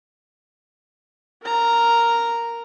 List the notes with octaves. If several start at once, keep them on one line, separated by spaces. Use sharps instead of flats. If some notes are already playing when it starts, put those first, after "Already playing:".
A#4 A#5